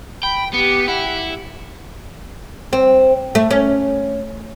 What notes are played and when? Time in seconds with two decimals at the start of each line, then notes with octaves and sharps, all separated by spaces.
0.23 G5 B5
0.54 B3 G4 C#7
0.88 E4 F#5
2.73 C4
3.35 A3
3.51 C#4